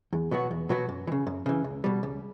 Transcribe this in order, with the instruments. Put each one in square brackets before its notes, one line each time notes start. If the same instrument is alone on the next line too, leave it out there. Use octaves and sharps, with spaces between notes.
[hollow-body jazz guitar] E2
B2 F#3 B3 F#4
E2
B2 F#3 B3 F#4
F#2
E3
C#3
F#2
C#3 E3
C#2
B2 G3
C#2